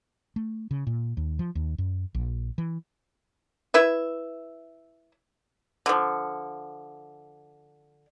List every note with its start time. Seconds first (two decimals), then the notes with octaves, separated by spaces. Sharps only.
0.36 A3
0.71 C#3
0.87 A#2
1.17 D#2
1.39 F3
1.55 D#2
1.78 F#2
2.15 A#1
2.58 E3
3.74 E4 B4 E5
5.86 D3 F3